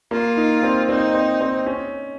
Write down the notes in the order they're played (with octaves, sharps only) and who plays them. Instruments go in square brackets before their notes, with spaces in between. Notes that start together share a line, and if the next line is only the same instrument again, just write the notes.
[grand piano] A#3 [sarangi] F4
[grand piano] D#4
C4
[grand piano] C4 [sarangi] D#4
[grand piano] C4
C4
C#4